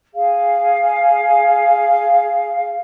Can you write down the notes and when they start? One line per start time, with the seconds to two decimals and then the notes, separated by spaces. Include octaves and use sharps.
0.14 G#4 F5